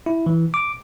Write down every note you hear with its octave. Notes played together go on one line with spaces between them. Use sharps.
E4
E3
D6